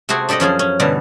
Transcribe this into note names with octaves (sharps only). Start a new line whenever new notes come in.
C3 A3 C4 F#4 G#4
D4 G4 A4 D5 D#5
F#2 F3 C#4 G#4
C#4
G2 B2 D3 E3